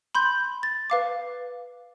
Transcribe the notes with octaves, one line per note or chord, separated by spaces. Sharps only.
B5 C6 G6
A6
B4 F5 D6